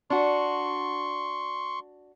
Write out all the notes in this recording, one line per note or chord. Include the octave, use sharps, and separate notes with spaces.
D4 F#4 C6 C#6